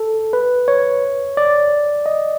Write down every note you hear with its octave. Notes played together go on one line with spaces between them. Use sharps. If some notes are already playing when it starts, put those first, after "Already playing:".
Already playing: A4
B4
C#5
D5
D#5